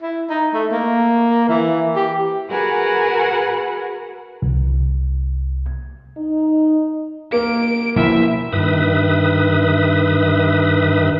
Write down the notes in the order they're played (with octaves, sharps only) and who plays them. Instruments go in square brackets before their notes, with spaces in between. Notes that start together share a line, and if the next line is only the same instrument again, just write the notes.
[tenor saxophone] E4
D#4
A3
A#3
E3
G4
[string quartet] F#4 G#4 A#4 B4 F#5 G#5
[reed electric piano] C2
[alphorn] D#4
[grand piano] A#3 [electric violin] D7
[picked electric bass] B2 F3 A#3 [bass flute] E4 [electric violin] E5
[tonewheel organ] G2 D#3 B4 E5 D#6